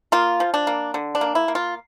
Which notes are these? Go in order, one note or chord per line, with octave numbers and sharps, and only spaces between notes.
A#3 F4
F3
D4
A#3
D3
D4
A#3
E4
A#3
F4